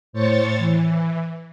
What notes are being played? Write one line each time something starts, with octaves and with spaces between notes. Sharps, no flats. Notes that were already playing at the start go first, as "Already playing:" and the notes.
A2 C5 C#5 A6 C#7
E3